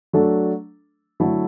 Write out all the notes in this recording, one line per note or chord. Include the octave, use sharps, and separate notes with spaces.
F#3 A3 D4 A4
D3 F#3 A3 E4 A4